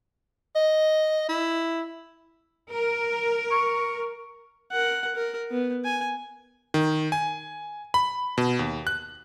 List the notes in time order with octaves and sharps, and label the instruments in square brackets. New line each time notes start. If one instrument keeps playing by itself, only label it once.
[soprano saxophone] D#5
E4
[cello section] A#4
[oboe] C#6
[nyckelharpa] A#4 F#5
A#4
B3
G#5
[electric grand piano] D#3
G#5
B5
B2
D#2
F#6